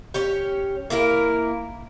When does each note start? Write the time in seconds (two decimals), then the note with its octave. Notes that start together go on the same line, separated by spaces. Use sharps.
0.14 C#4 G4 C#5
0.90 A#3 E4 G4 A#4